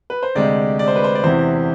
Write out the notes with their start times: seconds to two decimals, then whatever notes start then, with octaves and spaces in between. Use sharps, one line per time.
0.10 B4
0.23 C5
0.35 D2 C3 G#3 D5
0.79 D5
0.88 C5
0.96 B4
1.04 C5
1.15 D5
1.24 E2 C3 E3 C5